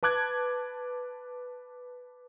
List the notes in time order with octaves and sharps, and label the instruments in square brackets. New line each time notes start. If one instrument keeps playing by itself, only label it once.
[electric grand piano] B4 A5 D6 F#6 G#6